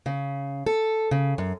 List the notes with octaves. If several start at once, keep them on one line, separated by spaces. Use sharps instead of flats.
C#3
A4
C#3
F#2